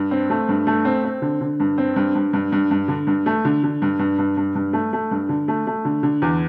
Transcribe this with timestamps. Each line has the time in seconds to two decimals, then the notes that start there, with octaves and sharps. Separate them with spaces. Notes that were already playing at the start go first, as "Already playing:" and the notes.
Already playing: G2
0.11 C4
0.30 A3
0.49 G2
0.67 A3
0.85 C4
1.04 C4
1.22 D3
1.41 D3
1.60 G2
1.78 C4
1.96 G2
2.15 G2
2.33 G2
2.52 G2
2.71 G2
2.88 D3
3.07 G2
3.26 A3
3.45 D3
3.63 D3
3.82 G2
3.99 G2
4.19 G2
4.37 G2
4.55 G2
4.73 A3
4.93 A3
5.11 G2
5.29 D3
5.48 A3
5.67 A3
5.85 D3
6.03 D3
6.22 E2